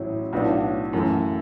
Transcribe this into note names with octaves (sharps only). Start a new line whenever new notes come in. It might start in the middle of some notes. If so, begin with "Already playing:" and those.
Already playing: A1 A2 F#3 C#4 E4
B1 A2 F#3 B3 D4
F#2 E3 A3